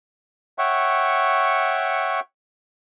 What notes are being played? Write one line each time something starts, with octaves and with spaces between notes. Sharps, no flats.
C#5 E5 F#5 G5 C#6